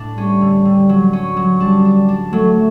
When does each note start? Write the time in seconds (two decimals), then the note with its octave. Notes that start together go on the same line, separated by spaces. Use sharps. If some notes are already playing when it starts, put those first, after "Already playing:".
Already playing: A2 D4
0.18 G3 C#4
0.41 D3
0.65 D3
0.89 F#3
1.13 C#4
1.37 F#3
1.60 G3 D4
1.85 D4
2.09 D4
2.32 F#3 A3